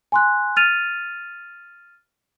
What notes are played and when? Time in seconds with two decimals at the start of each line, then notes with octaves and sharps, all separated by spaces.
0.12 G#5 C6 F#6
0.56 F6 A6 D#7 F7